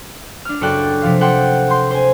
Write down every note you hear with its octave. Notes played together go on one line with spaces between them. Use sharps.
D4 F6
F#1 F#4 A4 D5 G5 F#6
C3 F3 F5
A4 F#5 G5 C6
C6 G6
C5 G#5